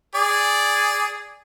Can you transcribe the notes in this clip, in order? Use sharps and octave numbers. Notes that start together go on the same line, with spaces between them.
G#4 D5